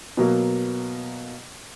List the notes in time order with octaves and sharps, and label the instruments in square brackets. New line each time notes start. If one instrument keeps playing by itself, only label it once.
[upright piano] B2 F#3 A#3